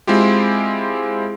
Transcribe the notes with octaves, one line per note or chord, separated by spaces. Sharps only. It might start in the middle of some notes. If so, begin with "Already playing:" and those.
G#3 C4 E4 F4 G4